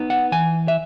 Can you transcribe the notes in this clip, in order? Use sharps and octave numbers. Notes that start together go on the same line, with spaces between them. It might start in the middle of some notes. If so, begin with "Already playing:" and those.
Already playing: B3 D#4
F#5
E3 G#5
E5